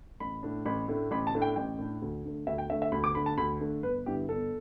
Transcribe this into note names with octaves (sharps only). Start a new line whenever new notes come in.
A1 B5
A2 A3 D4
A1 B5
A2 A3 D4
A1 B5
A5
A2 A3 D4
G5
A1 G5
A2 A3 D4
D2
D3 A3
D2 E5
G5
D3 A3 E5
E5
D2 B5
D6
D3 A3 B5
A5
D2 B5
D3 A3
G1 B4
G2 D3 B3 E4 G4
G1 A4